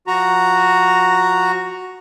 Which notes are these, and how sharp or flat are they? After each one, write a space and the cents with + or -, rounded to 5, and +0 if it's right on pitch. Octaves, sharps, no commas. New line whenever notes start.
F3 +10 F#4 +0 A#5 +0